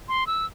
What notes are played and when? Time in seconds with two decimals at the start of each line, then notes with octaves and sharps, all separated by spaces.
0.08 C6
0.27 E6